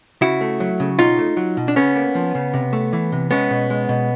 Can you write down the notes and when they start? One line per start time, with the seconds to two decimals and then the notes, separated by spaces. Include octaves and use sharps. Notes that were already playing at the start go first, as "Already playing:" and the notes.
0.21 C#3 E4 F#4
0.41 A3
0.60 F#3
0.80 C#3
0.99 B2 D#4 F4
1.19 A3
1.37 F#3
1.57 B2
1.68 D4
1.76 C#3 B3 C#4
1.96 A#3
2.15 F3
2.35 C#3
2.54 C3
2.73 A3
2.93 E3
3.12 C3
3.31 G#3 B3 C#4
3.51 B2
3.70 G#3
3.89 B2